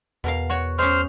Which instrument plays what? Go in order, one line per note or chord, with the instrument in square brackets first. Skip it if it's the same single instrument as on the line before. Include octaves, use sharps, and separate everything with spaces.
[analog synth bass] E2 [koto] B2 A#4 F5
[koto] F#4 C#5
[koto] G#3 C#4 [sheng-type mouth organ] C5 F6